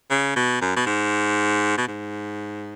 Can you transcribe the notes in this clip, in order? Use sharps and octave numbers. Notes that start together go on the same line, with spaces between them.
C#3
B2
F#2
B2
G#2
B2
G#2